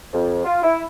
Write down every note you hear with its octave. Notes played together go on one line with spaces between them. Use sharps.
F2
F4
E4